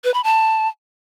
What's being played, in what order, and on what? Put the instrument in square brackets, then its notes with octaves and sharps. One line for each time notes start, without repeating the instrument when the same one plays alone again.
[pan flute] B4
B5
A5